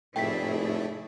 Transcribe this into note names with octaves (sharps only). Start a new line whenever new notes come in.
F1 A2 A3 E4 G#4 D5 G5 B6